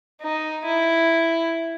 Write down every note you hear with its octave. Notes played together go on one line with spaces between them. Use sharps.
D#4
E4